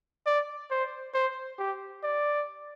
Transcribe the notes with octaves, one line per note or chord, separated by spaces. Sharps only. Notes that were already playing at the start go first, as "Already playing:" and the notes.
D5
C5
C5
G4
D5